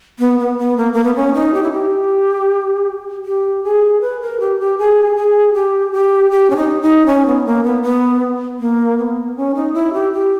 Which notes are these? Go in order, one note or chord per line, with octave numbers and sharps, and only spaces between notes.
B3
B3
B3
A#3
A#3
B3
C#4
D#4
G4
E4
G4
G4
G#4
B4
A#4
G4
G4
G#4
G#4
G4
G4
G4
C#4
D#4
D#4
C#4
B3
A#3
B3
B3
A#3
B3
C#4
D#4
E4
G4
G4